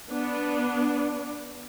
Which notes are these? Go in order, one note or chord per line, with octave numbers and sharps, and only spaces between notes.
B3 D4